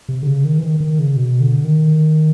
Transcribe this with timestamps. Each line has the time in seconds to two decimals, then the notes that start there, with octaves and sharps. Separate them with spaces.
0.09 C3
0.22 D3
0.27 C#3
0.45 D#3
0.58 E3
0.63 D#3
0.80 D#3
0.99 C#3
1.16 B2
1.40 D3
1.64 D#3